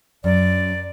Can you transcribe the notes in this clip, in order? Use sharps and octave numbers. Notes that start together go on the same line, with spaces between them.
F#2 D5